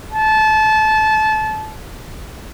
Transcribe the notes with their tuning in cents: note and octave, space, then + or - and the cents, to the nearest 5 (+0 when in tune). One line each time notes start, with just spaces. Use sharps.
A5 -25